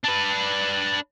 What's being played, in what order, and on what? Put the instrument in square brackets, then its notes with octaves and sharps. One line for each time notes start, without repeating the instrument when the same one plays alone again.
[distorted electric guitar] D4 B4